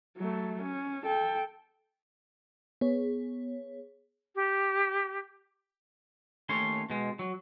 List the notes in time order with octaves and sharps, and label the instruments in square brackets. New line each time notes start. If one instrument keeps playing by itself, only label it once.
[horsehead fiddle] F#3 A3
C#4
A4 G5
[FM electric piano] B3 G#4 C#5
[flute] G4
[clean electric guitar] D#2 A3 C#4 C#5 C6
B2 G#3
F#3